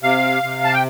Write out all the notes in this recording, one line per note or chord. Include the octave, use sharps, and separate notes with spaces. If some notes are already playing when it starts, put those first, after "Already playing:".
C3 F5
C3
A5
G5